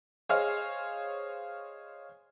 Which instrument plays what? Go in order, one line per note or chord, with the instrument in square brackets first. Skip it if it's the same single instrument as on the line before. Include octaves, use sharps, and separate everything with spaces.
[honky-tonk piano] G#4 C5 C#5 D#5 F5 F6